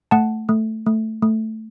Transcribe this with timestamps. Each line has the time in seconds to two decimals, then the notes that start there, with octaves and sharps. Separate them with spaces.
0.11 A3 F#5 A5
0.49 A3
0.86 A3
1.22 A3